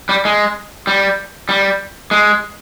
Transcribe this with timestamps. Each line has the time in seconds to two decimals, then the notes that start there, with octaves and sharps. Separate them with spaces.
0.09 G3
0.25 G#3
0.87 G3
1.49 G3
2.11 G#3